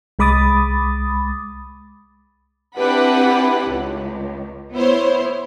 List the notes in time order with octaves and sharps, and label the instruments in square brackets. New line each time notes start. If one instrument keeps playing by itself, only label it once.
[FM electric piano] C2 G#3 B5 D6 D#6 A6
[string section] C4 D4 E4 G4 B4 F#5
C#2
B3 E4 C5 C#5